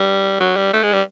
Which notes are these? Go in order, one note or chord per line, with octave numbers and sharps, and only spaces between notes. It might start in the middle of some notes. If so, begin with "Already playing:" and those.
Already playing: G3
F#3
G3
A3
G#3
G3